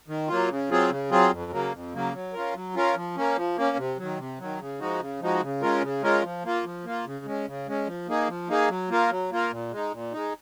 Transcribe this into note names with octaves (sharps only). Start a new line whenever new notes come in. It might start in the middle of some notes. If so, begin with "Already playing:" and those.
D#3
F#3 A#3 F4
C#3
F#3 C4 F4 G#4
C#3
F#3 C4 F4 G#4
F2
C#3 F#3 A#3
F2
C#3 F#3 A#3
F#3
C#4 F4 A#4
F#3
C#4 F4 A#4
F3
A#3 C#4
F3
A#3 C#4
C3
D#3 F#3
C3
D#3 F#3
C#3
F3 G#3 D#4 F#4
C#3
F3 G#3 D#4 F#4
C#3
G#3 C#4 F4 A#4
C#3
G#3 C#4 F4 A#4
F3
A#3 F4
F3
A#3 F4
C#3
G#3 C#4
C#3
G#3 C#4
F3
A#3 D#4 G#4
F3
A#3 D#4 G#4
F#3
A#3 F4 A#4
F#3
A#3 F4 A#4
A#2
G#3 D#4
A#2
G#3 D#4